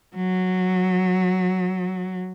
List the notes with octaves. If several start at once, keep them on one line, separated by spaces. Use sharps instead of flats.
F#3